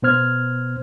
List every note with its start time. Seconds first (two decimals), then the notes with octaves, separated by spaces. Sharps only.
0.02 B2 B3 C5 F6 G#6